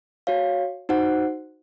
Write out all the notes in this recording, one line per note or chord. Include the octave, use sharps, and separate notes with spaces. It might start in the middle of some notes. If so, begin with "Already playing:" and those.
F#4 C#5 F5
D#4 F#4 C5 F#5